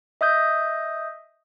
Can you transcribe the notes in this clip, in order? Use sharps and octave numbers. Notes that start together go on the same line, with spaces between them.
D#5 E5 D#6 G6